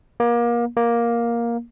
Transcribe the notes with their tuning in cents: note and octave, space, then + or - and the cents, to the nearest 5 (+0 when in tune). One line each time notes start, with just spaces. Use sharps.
A#3 +30
A#3 +10